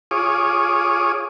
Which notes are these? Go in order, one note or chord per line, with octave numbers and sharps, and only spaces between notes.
F4 G#4 C#5 D6 D#6